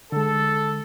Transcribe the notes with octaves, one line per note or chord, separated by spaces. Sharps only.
D3 G#3 A4